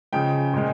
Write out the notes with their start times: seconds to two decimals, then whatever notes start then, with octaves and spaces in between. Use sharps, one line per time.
0.12 C#3 F3 G#3 G5
0.54 A#2 F3 G#3